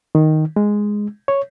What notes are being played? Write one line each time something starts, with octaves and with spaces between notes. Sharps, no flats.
D#3
G#3
C#5